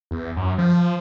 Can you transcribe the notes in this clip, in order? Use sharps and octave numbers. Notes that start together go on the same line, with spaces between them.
E2
F#2
F3